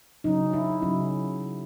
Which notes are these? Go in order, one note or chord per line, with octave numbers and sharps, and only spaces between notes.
C#3 F#3 C#4 D#4
E4
C#3 F#3 C#4 E4